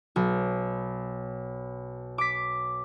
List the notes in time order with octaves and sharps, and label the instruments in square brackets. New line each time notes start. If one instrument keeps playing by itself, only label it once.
[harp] B1
D6 B6